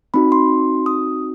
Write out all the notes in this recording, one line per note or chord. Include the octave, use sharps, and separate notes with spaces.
C4 D#4 F#4 B5
C6
D#6